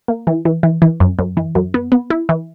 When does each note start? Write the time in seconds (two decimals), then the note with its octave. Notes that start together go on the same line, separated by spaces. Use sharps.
0.08 A#3
0.27 E3
0.45 E3
0.63 E3
0.82 E3
1.00 F#2
1.19 F#2
1.37 E3
1.55 F#2
1.74 B3
1.92 B3
2.10 E4
2.29 E3